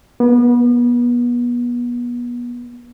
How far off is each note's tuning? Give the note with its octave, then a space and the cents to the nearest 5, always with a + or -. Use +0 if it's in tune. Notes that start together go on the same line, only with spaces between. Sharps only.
B3 -35